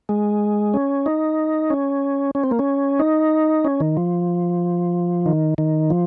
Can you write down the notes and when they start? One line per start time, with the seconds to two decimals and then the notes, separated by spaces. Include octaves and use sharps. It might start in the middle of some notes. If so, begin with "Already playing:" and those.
0.09 G#3
0.74 C#4
1.06 D#4
1.70 C#4
2.35 C#4
2.44 C4
2.51 A#3
2.59 C#4
2.99 D#4
3.65 C#4
3.80 D#3
3.97 F3
5.26 D#3
5.58 D#3
5.90 F3